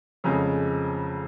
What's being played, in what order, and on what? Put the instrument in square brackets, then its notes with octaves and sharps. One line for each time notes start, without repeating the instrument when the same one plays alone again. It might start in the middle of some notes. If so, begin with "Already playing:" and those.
[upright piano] F1 F2 C#3 G#3 C#4